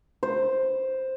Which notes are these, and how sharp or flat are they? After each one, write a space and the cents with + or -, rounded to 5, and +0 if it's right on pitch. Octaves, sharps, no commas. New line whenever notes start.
C5 +5